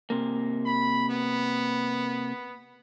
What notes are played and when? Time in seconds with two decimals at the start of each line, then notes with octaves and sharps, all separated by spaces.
0.10 C3 A#3
0.66 B5
1.09 B3